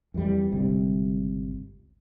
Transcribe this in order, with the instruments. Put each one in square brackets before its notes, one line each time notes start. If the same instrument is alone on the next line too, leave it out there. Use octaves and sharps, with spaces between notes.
[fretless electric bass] F2 E3 G3
G1 C#2 C3 G3